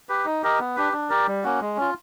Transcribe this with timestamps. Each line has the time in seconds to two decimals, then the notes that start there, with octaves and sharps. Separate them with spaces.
0.09 G4 B4
0.25 D#4
0.43 G4 A#4 D#5
0.59 B3
0.76 D4 G4 B4
0.93 D4
1.10 G4 A#4 D5
1.27 G3
1.43 A#3 C#4 F#4
1.61 G#3
1.77 C#4 F4